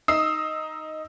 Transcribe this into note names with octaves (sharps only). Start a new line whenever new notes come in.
D#4 D#6 E6 C7